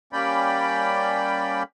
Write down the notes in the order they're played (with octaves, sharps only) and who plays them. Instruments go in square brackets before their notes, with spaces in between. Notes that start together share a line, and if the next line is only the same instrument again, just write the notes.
[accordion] G3 A#3 C#4 D5 G5 B5